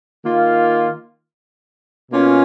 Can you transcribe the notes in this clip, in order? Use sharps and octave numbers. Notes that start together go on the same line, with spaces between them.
D#3 A#3 F4
B2 A#3 C#4 F4